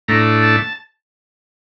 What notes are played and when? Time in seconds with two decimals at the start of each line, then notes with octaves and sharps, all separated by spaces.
0.08 A2 A3 D4 A#5
0.42 A5